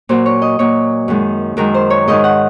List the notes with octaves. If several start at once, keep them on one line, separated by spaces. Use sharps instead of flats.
A#2 F#3 C5
C#5
D#5
A#2 F#3 C#5
F#2 D#3 G#3
F#2 D#3 G#3 A#4
C5
C#5
G#2 D#3 G#3 D#5
F#5